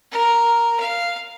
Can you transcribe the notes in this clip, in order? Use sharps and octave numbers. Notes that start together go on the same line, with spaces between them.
A#4
F5